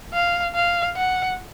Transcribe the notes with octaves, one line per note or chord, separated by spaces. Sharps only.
F5
F5
F#5